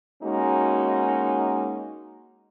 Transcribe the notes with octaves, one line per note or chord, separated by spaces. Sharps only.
G#3 A#3 C#4 D#4 F#4